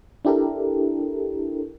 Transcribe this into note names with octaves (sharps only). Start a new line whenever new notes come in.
D4 E4 G4 A4 A#4